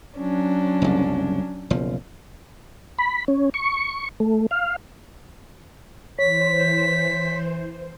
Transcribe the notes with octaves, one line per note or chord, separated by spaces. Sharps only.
F#3 C#4 D4
F#1 C2
F#1 B1 F3
B5
C#4
C#6
A3
F5
E3 C5 C#5 B6